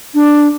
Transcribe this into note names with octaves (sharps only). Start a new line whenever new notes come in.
D4